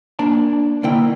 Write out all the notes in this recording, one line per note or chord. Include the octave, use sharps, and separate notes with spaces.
A#3 D4 D5 A5
B2 D3 A#3 E4 G5